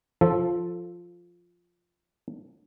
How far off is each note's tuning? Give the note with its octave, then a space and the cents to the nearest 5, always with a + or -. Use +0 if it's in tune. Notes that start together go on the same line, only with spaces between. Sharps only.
F3 +0 A4 +0